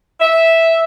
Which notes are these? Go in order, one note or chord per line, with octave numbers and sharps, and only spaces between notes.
E5